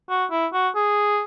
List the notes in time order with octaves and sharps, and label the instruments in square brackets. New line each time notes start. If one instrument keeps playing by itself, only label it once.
[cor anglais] F#4
E4
F#4
G#4